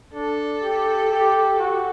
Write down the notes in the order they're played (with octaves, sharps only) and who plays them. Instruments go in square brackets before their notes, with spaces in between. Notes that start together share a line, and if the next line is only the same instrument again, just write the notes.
[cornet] D4 [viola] A4
[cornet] G4
G4
F#4